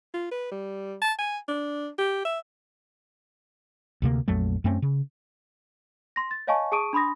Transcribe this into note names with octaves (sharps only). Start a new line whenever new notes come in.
F4
B4
G3
A5
G#5
D4
G4
E5
D2 C3 A#3
A#1 F2 F#3 A3
F#2 A3 C4 C#4
C#3
C6 A#6
A6
C#5 D#5 F5 G#5 A5 C#6
G#4 A5 C#6 D#6 D7 D#7
D4 B5 C6 D#6 A#6